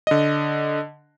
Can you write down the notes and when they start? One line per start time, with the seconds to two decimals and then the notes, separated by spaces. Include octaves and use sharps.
0.07 D3 D#5